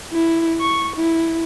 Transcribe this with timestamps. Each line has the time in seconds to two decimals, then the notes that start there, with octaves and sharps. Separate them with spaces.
0.13 E4
0.61 C#6
0.97 E4